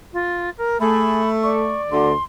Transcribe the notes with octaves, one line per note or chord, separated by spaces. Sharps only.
F4
A#4
A3 G#4 B5
D5 C#6
D2 D3 C6